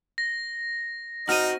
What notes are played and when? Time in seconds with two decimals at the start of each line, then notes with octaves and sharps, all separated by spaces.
0.18 A#6
1.29 C4 D#4 F#4 D#5 F6 D#7